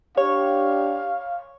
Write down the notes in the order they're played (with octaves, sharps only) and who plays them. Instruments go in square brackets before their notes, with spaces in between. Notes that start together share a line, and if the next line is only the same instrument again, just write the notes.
[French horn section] D4 G4 [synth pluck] C#5 [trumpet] F5